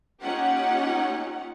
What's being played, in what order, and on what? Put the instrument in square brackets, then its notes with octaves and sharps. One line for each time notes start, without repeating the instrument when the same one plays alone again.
[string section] A#3 C#4 D#4 F4 G4 F#5